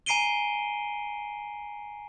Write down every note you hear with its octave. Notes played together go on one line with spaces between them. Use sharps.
G#5 A#5 C7 D7 D#7 G7